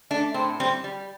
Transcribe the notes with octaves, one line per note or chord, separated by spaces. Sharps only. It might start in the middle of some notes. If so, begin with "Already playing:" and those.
A3 D4
A2 C4
G3 C4
G3